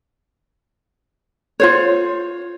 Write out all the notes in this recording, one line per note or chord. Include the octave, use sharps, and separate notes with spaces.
F4 C5 C#5